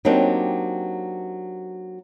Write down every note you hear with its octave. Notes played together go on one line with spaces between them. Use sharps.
F#3 A#3 C4 D4 D#4 G4